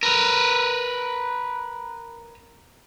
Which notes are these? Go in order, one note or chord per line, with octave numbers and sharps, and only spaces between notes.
A#4 B4